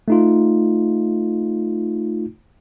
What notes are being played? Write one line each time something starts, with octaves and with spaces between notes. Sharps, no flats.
A3 D#4 F4